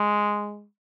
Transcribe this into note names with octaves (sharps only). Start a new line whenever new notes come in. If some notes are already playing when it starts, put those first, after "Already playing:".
Already playing: G#3